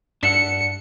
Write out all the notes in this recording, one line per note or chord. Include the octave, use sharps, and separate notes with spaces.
G2 D4 E5 F#5 C#7